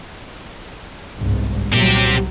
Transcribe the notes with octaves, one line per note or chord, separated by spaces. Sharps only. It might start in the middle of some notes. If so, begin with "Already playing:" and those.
G1 C2 G#2
C2 A#2 F#3 C4 G4